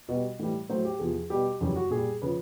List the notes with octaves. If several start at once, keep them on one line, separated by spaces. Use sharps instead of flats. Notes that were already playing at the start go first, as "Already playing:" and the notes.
B2 G3
A2 E3 G3
A2 F#3 C5
G4
E2 C3 F3 G#4
B2 G3 G4
F#2 C#3 E3 G3
F#4
A#2 G3 G#4
C#3 F3 B4